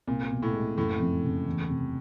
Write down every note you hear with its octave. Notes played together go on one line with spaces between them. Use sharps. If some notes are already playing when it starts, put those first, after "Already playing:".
C2 A#2
B2
A2
G#3
F#1 A2
F2
C#3
E2
C3